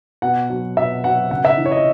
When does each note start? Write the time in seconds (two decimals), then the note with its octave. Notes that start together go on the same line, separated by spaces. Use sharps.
0.22 B2 F#5
0.50 F#3
0.77 B2 E5
1.04 F#3 F#5
1.31 C#3 F#5
1.45 E5
1.58 E3
1.66 C#5
1.72 D#5